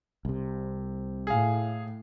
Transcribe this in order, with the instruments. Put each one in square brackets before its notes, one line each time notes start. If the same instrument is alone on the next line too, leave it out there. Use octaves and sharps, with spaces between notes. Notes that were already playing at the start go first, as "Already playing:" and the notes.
[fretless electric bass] C2 C3
[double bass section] A2 [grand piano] G#4 F5